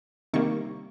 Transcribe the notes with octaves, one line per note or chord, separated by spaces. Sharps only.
C3 D#3 G3 A#3 C#6